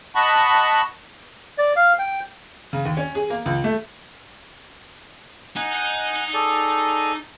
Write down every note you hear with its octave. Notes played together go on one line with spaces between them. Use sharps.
D#5 F#5 A5 B5 C#6
D5
F5
G5
C#3
D#2
C#4
G#4
A#3
C#2
A3
D#4 D#5 F#5 G#5 F#6
G#4 A4 D5